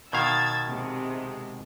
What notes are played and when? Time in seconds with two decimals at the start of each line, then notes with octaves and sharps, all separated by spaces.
0.13 B2 D#3 F5 E6 G#6 A6
0.68 C3 G#3